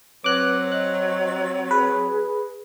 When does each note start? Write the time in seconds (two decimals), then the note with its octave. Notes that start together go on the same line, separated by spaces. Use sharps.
0.24 F#3 C4 B4 D6 F#6
0.72 D#5 F#6
1.71 G#4 B4